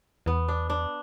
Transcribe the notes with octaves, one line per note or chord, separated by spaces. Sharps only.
E2 B3
D4
D4